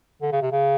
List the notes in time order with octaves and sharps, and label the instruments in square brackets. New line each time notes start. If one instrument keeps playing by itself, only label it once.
[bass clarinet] D3
C#3
C3
C#3